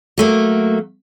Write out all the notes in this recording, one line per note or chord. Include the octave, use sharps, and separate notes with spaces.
F#3 A3 A#3